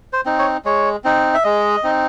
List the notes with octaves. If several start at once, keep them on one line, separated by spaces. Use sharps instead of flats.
C5
C4 D#4
C#5
G#3 C#5
C4 D#4
E5
G#3 D#5
C4 D#4